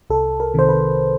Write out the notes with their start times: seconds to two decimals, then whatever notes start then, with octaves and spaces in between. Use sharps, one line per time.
0.10 C2 A4
0.40 A#4
0.54 C3 D#3 C5
0.69 B4